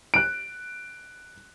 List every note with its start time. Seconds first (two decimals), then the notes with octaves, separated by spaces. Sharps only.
0.14 F#6 D7